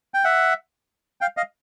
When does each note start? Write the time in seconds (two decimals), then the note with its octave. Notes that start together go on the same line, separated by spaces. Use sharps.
0.14 G5
0.24 E5 F#5
1.21 F5 G5
1.37 D#5 F5